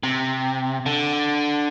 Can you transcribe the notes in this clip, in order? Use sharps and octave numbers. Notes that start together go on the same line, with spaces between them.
C3
D3